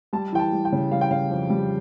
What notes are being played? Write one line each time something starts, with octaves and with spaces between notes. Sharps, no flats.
G3 A5
E3 G5
A5
G3
G5
C#3
G3 F5
G5
C#3 F5
F2
G3